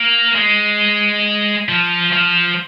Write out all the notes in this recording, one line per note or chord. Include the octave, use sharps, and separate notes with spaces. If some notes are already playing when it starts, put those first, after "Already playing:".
Already playing: A#3
G#3
F3
F3